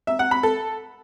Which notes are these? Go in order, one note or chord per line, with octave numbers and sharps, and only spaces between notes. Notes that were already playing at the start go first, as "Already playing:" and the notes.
E5
F#5
B5
A4